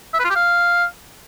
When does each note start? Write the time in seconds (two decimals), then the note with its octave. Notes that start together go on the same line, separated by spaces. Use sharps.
0.14 E5
0.19 B4
0.25 F4
0.30 G4
0.36 F5